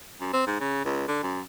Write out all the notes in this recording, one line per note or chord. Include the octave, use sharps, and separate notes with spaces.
F#2
C4
G#2
C#3
C#2
D3
F#2